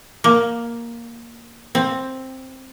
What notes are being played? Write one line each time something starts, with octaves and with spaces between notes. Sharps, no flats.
A#3
C4